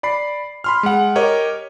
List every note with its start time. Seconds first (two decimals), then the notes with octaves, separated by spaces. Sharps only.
0.03 D5 B5 C7
0.64 B5 C6 F6
0.83 G#3 F#5
1.15 G4 A#4 C#5 D#5